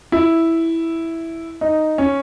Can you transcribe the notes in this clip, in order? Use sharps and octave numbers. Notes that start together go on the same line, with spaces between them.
E4
D#4
C#4